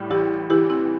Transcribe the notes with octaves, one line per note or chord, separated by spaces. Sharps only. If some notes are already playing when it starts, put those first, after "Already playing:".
Already playing: A2 G3
A1 E4 G4
E3 E4 G4
C4 E4